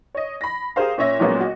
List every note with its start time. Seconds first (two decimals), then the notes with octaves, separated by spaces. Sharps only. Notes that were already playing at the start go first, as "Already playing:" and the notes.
0.15 C#5 D#5
0.41 B5 A#6
0.76 G4 G#4 A#4 C5 F5
0.98 A#2 C#4 C#5 E5 A#6
1.20 A#2 F#3 G#3 A#3 B3 C#4
1.40 F#4 D#5